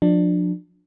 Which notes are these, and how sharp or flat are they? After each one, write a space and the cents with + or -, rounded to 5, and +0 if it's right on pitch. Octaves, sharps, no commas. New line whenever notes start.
F3 +35 D4 +20